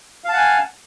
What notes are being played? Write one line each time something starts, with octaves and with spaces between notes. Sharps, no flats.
F5 F#5 G#5 A5